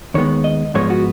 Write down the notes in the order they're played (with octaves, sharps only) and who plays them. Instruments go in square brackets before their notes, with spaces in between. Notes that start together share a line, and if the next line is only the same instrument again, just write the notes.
[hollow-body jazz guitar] D#2 D#3 G#3 B3 C#5
D#5
G#2 F3 G#3 B3 C#5
F#4